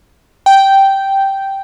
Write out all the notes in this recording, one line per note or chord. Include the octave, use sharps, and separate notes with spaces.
G5